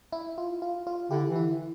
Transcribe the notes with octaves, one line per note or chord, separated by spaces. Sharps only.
E4
F4
F4
F4
D3 E4 G4
E3
E4